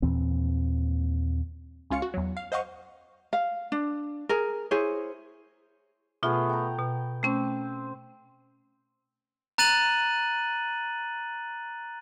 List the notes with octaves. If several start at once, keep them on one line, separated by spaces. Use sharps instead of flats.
D#2 A#2 E3 C4
C#2 C#4 F4 F5 C#7
F#4
E2 F#3
F5
C5 D#5 F5 F#5 C#6
F5
D4
G#4 A#4
E4 G#4 C5 C#5
B2 A3 B3 F4 G#4
G5 A#5
B2
A3 C4 C#4
A#5 F#6 A6 D#7 F#7